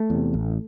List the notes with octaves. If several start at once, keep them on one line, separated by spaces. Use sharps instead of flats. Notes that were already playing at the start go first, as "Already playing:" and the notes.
Already playing: A3
E2 C3
A1